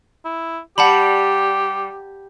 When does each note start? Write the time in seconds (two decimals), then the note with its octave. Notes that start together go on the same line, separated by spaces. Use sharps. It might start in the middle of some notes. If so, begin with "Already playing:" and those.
0.25 E4
0.78 G3 G4 F#5 A5 B5